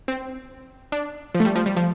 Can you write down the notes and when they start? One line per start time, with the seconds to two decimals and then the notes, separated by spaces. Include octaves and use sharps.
0.08 C4
0.92 D4
1.35 F3
1.40 A3
1.45 G3
1.56 F3
1.66 G3
1.77 F3